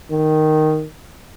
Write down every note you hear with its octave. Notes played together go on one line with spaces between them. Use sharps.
D#3